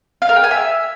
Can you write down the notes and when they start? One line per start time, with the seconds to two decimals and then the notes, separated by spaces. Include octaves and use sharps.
0.22 F5
0.29 A#4
0.36 G5
0.44 G#5
0.51 E5